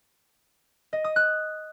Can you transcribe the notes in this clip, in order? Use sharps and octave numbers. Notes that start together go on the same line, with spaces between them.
D#5
D#6
F#6